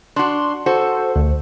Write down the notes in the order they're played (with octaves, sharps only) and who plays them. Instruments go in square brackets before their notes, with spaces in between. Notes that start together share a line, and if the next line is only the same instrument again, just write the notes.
[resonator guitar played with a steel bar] D4 F#4 [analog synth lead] C6
[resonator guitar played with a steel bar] F#4 A4 [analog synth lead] C5
[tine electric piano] D2